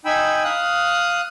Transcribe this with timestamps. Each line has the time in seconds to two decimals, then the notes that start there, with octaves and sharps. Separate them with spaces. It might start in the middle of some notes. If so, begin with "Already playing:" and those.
0.05 D#4 G5 G#5 B5 E6
0.44 F5 D#6 F#6